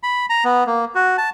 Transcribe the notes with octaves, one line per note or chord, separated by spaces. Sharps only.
B5
A#5
B3
A#3
F#4
A5